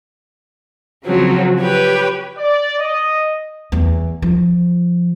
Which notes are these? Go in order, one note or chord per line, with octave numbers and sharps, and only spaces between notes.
C#3 F3 F#3 C4
G4 B4 C#5 G5
D5
D#5
E2
F3